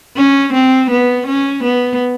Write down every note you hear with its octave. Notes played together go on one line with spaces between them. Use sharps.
C#4
C4
B3
C#4
B3